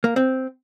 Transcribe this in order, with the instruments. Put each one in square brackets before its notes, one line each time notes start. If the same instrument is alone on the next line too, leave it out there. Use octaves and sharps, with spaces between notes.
[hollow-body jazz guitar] A#3
C4